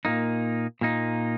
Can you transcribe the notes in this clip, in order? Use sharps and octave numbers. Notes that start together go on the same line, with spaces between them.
A#2 A#3 D#4
A#2 A#3 D#4